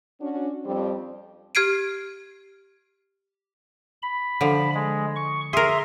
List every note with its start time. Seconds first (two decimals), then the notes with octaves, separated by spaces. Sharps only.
0.21 C#4 D4 F#4
0.65 F2 G3 C4
1.55 G4 F6 G#6 C7 D7 D#7
4.03 B5
4.41 D3 F3
4.75 G#3
5.16 C#6
5.53 G#4 A#4 E5 C6